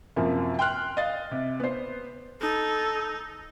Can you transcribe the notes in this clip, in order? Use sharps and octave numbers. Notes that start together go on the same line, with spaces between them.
F#2 C3 F3 A#3
G5 C6 F6 F#6
D#5 F5 A6
C3
B3 C5
D#4 A4